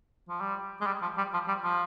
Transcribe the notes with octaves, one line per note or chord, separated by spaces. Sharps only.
F3
G3
G#3
G3
F3
G3
F3
G3
F3